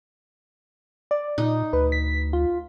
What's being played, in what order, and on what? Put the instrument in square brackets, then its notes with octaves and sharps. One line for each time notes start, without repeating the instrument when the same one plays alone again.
[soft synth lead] D5
[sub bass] A#2 [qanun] D#4
[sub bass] D2 [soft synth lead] B4
[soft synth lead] B6
F4